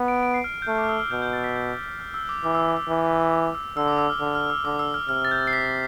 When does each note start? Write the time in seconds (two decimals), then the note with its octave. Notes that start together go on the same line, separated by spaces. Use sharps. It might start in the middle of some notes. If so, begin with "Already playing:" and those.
Already playing: B3
0.08 D7
0.23 D7
0.34 C7
0.44 F6
0.62 G6
0.67 A3 F6
0.78 D6
0.84 F6
0.89 E6
1.00 F6
1.11 B2 G6
1.22 G6
1.33 A6
1.44 B6
1.55 G6
2.00 F6
2.14 E6
2.29 D6
2.44 E3 D6
2.55 E6
2.66 D6
2.77 E6
2.89 E3
3.32 D6
3.55 E6
3.77 D3 E6
3.88 D6
3.98 E6
4.10 F6
4.20 D3
4.35 F6
4.50 E6
4.65 D3 D6
4.79 E6
4.94 F6
5.09 C3 F6
5.25 A6
5.31 G6
5.47 C7
5.53 B6